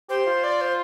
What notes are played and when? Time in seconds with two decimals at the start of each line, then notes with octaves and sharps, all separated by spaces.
0.09 G4 C5
0.27 F4
0.44 D5
0.61 C5